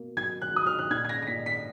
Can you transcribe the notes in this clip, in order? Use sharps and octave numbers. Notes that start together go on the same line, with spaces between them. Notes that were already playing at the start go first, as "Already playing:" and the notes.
Already playing: B2 A#3
F#3 G#6
F#6
F#3 D#6
F6
F#6
A#2 G#6
G#6
A#6
A#6
A#2 B6
B6